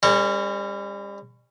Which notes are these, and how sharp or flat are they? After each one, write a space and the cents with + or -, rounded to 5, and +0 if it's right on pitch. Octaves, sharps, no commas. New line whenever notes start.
G3 +40 C#4 -15 A#4 -30